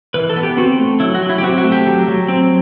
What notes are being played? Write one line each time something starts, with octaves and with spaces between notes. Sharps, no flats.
E3 B4
A4
B3
G4
C4 F#4
A3
F#3 E4
F#4
F#3
E4
G4
C4 F#4
F#4
A3
G4
F#3
F#3
C4